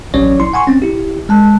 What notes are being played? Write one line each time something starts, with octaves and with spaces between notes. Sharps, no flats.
A1 F#3 C#4 C#5 D5
E4 C6
F#5 G#5 C6 C#6
C4 C#4
E4 G4
G#3 A5 F#6